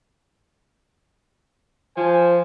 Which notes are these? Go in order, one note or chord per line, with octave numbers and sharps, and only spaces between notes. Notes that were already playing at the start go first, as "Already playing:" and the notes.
F3 C5 G#5